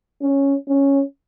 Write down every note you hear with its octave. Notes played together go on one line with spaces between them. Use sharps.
C#4
C#4